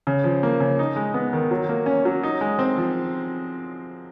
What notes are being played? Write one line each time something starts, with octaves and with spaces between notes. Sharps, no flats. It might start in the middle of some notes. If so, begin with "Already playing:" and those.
C#3
F3
A#3
C#3
D#4
G#3
B3
D#3
F#3
A#3
C#4
F#3
D#4
G#3
C4
F3